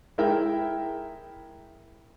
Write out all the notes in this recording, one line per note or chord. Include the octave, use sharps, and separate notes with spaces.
G#3 E4 A#4 E5 G5